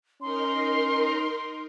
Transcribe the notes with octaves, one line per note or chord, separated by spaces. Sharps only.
C#4 D#4 A#4 C6